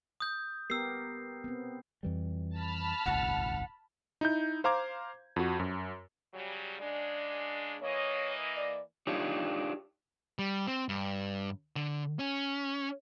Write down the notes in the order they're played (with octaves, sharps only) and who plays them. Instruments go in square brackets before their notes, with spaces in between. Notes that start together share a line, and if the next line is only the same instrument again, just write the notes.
[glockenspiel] D#6 G6
[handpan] B3 G4 A#4 [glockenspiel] E6 C7
[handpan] B3 C4
[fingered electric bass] F2 E3 G3
[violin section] A5 B5 F6
[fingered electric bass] D#1 G#1 C#2 [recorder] F#5
[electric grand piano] D#4 E4 G6
C5 F5 A#5 D6 G#6
F2 F#4
F#2
[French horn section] C#3 F#3 G3
[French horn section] C#3 G#3 D4 [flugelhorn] D5
[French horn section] E3 A#3 D#5 [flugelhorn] C#5
[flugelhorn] D5
[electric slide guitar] D4 D#4 F4 G4 C#5
[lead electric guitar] G3
C4
G2
D3
C#4